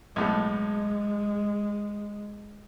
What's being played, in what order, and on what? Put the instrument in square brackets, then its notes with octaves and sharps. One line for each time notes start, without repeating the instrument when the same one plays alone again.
[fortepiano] B1 A2 A3 [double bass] G#3